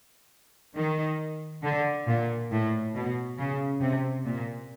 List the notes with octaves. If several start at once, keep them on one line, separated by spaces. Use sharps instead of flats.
D#3
D3
A#2
A2
B2
C#3
C3
A#2